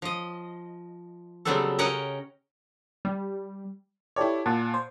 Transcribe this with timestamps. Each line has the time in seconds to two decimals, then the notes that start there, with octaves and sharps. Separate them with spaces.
0.02 F3 D#5
1.45 C#3 F#3 G3 B3 C4 A4
1.79 C#4 A#4 C#5 D#5 F#5 G5
3.05 G3
4.16 E4 G4 A4 C#5 D5
4.46 A#2 F#5 A5
4.74 C5